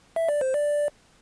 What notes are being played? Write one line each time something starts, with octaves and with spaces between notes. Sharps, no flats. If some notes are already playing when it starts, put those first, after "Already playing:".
E5
D5
C5
D5